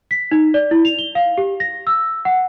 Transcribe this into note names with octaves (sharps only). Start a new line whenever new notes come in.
B6
D#4
D5
E4
F7
G7
F5
G4
A#6
E6
F#5